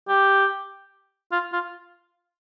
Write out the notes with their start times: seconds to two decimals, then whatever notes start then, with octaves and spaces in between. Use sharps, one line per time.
0.08 G4
1.32 F4
1.53 F4